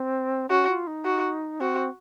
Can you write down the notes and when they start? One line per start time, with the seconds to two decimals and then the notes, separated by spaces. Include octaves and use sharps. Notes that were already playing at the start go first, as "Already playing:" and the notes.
Already playing: C4
0.49 C#4 F#4
0.68 F4
0.87 D#4
1.05 F#4
1.60 C4 F#4